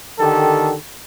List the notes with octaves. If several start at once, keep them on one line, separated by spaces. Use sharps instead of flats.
D3 D#3 G4 A4